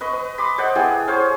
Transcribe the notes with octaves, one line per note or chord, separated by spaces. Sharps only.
B4 D#5 C#6
B4 D#5
B5 C6 D6 D#6
C5 D5 D#5 F#5
B3 E4 G4 G#4
G#4 C5 C#5 F5